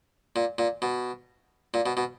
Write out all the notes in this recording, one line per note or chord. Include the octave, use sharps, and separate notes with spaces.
A#2
A#2
B2
A#2
B2
B2